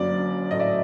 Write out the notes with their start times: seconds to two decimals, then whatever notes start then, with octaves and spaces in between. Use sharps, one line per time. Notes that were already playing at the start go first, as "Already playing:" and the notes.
Already playing: F#1 F#2 D3 F#3 D5
0.51 A2 F#3 A3 D#5
0.60 D5 E5